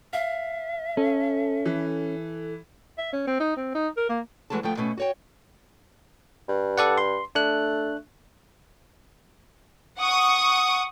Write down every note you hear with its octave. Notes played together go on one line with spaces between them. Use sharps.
E5 F5
C#4 A4
E3
E5
C#4
C4
D#4
C4
D#4
A#4
A#3
E3 F#3 G#3 A3 A5
D2 F3 A3 G5
B2 A3 C#4
F#4 C#5 G5
G2
A4 D5 F#5
C6
A3 D4 F#6
F#5 C#6 D#6